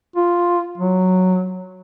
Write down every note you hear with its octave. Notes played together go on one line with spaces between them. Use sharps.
F4
F#3